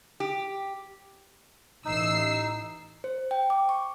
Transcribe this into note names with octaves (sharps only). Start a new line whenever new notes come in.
G4
A1 D#4 E6 C7
C5
G5
D6
C#6